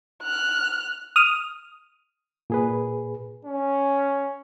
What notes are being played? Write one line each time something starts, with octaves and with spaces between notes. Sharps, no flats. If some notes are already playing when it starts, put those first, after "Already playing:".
F6 F#6
D#6 F6
A#2 G#4 B4
C#4